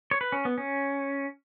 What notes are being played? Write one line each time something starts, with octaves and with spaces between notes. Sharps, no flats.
C#5
B4
C#4
B3
C#4